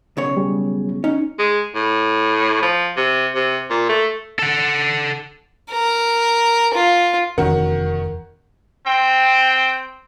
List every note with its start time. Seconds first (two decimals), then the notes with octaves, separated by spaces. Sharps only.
0.17 B1 C#3 C#5
0.37 G3 G#4
1.04 C#4 D#4
1.39 G#3
1.75 A2
2.62 F3
2.97 C3
3.35 C3
3.71 A#2
3.89 A3
4.39 A4 F#5
5.71 A#4
6.74 F4
7.38 F1 E2 D#3 C#4 F#4 A#4 F#5
8.86 C4 G5